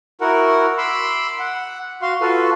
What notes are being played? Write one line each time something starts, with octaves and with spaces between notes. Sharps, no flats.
E4 F#4 A#4 F#5
B5 C6 D6 E6
F#5
F#4 F5 C6
F4 F#4 A4 B4